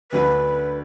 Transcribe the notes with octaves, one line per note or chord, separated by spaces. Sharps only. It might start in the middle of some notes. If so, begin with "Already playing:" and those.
D2 D3 F#3 D4 B4